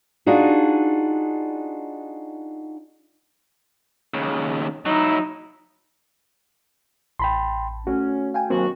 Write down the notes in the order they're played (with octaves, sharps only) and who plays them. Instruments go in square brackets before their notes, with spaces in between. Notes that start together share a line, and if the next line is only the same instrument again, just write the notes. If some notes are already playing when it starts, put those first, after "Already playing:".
[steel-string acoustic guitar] D4 D#4 F4 F#4 G#4
[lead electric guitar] D#2 C#3
[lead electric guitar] F#3 E4 [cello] D#4
[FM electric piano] A1 A5 [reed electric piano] G5 B5 C6
[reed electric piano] A3 F#4 [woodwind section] C#4
[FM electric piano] F5 G5 G#5
[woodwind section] D#2 D4 F#4 [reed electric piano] F#3 A#3 C4